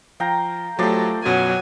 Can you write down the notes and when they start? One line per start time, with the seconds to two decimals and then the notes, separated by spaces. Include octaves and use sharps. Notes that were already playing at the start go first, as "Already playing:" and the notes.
0.20 F3 F5 G5 A#5
0.79 F3 F#3 A3 G4 D5 C6
1.25 F#2 B2 F#3 G#5